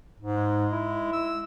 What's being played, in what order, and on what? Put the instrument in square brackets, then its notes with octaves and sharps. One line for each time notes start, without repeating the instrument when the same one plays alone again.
[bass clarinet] G#2
[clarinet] G#3
[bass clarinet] E4
[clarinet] E6